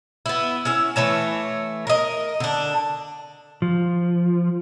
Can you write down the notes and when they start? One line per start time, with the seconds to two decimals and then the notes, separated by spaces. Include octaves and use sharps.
0.26 B3 E4
0.65 C#4 E4 E5
0.96 E3 A3 C#5 A5
1.87 A#4 D#5
2.40 D3 D4
3.62 F3